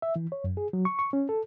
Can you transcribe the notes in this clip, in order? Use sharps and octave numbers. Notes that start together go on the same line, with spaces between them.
E5
E3
C#5
F#2
G#4
F#3
C#6
C#6
C#4
A4